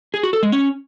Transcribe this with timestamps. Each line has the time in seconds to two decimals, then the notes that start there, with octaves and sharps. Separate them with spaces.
0.14 G#4
0.23 F#4
0.33 A4
0.43 G#3
0.52 C#4